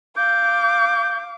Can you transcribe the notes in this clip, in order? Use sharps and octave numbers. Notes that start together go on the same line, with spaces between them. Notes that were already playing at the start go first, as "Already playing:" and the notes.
F5 D6 G6